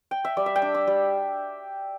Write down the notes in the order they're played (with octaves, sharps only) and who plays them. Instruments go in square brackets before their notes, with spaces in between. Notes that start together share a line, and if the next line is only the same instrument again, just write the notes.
[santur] G5
E5
G3 D5
E5
G5
D4
D6
G3